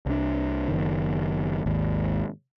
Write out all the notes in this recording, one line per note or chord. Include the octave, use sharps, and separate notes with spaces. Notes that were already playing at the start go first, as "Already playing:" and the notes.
C2 D4
F#1 D#3
G#1 D#2